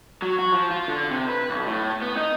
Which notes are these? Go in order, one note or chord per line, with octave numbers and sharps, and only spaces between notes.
F#3
F#4
F3
F4
D3
C3
B4
B1
A2
B3
D#4